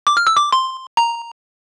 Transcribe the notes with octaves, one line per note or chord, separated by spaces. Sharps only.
D6
F6
E6
D6
C6
A#5